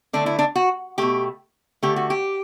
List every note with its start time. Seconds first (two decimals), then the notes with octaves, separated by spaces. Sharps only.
0.13 D3 A3 D4
0.26 E4
0.39 D4
0.56 F#4
0.98 B2 A3 G4
1.83 D3 A3 G4
1.96 F#4
2.10 G4